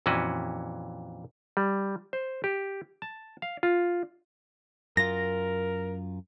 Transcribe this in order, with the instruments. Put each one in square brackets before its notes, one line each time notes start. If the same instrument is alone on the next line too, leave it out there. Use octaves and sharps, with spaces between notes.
[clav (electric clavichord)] F2 A#2 E3 C#4 F#4 B4
G3
C5
G4
A5
F5
F4
[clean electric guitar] F#2 F4 [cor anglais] A#4 [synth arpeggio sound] A#6